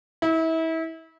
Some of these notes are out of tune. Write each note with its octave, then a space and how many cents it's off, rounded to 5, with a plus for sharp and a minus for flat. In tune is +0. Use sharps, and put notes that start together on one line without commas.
E4 -30